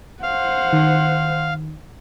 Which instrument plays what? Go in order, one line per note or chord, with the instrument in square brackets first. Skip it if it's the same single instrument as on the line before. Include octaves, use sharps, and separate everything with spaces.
[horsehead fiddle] C5 F#5 [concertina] F5
[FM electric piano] D#3